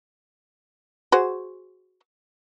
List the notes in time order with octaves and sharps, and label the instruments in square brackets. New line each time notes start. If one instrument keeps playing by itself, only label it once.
[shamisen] F#4 G#4 C5